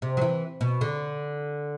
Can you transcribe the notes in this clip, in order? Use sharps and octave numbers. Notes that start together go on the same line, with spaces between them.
C3
F#3
E3
B2
D3